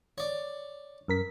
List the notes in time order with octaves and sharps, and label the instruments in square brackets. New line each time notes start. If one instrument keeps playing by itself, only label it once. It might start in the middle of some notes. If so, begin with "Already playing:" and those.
[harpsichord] C#5 D5
[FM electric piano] F#2 A#4 B6